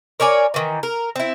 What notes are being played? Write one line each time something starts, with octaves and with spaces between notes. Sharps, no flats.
A#4 C#5 D5 G#5
D#3 E3
A#4
C4 E4